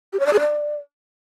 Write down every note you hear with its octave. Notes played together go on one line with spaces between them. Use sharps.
G4
C#5
D5
G#4
D5